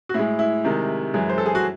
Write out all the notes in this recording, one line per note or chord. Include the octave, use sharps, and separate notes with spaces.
F#4
A2 G#3 E4
E4
C3 D#3 G#3
F#2 E3 G#3
C5
A4
G#4
F#4